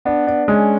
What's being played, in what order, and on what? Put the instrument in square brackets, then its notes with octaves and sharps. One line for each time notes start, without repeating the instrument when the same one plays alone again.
[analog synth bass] B3 [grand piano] D4
[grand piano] D4
[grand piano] G#3 [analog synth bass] C#4